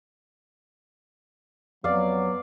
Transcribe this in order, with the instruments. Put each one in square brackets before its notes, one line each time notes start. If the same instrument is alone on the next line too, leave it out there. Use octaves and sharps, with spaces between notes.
[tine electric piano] F2 [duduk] F#3 [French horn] B3 [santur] D5 F5